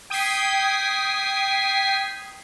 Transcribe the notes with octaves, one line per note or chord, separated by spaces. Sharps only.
G5 D#6 G#6 B6 C7